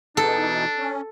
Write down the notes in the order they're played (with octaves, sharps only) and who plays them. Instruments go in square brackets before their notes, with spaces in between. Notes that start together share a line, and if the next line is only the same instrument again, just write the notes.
[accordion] B2 E3 D#4 [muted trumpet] D4 [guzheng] A4
[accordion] C#4